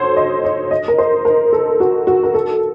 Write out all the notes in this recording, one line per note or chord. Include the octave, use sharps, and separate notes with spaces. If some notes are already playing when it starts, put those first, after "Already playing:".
Already playing: F#4 A4 C5 C#5
D#5
C#5
D#5
A#4
C5
A#4
A4
F#4
F#4
A#4
A4